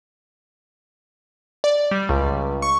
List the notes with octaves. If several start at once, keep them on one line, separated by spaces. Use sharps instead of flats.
D5
G3
C#2
C#6